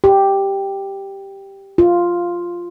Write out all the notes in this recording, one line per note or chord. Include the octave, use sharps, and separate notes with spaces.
G4
F4